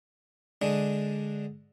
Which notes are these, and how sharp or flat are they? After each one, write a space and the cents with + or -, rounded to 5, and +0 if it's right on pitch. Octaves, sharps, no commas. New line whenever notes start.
D3 +0 G#3 +0 D4 +0